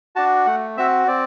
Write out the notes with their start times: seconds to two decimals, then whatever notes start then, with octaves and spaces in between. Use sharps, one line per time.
0.16 D4 F#4 A5
0.46 A3 F#5
0.77 C4 F#4 E5
1.08 C4 D5